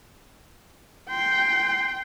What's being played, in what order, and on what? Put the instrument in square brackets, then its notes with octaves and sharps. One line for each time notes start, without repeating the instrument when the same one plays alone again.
[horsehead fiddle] G5 [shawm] C6